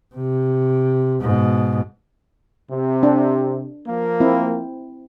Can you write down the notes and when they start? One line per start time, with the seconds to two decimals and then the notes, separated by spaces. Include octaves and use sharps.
0.15 C3
1.21 G#2 B2
2.70 C3
3.03 D4
3.87 F3 A#3
4.20 C4 E4